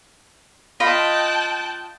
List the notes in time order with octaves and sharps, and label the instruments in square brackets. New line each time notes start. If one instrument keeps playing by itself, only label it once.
[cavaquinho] F4 D#5 B5 [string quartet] G5 A5 F#6